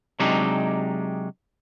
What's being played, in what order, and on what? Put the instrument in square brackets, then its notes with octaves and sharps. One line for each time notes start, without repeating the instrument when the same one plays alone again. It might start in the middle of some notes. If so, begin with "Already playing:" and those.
[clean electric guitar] C3 F#3 G#3 D4 D#4 G4